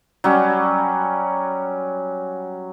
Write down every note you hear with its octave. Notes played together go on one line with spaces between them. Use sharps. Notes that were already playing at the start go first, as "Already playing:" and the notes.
F#3 G3 C#4